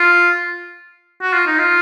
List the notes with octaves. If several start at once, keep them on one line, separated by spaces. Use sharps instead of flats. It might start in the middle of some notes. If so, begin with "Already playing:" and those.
Already playing: F4
F#4
F4
D#4
F4